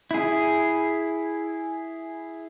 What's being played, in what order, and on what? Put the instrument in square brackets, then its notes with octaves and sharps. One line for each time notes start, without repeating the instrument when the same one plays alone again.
[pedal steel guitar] E4 G#4